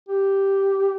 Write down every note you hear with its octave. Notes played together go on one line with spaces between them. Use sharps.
G4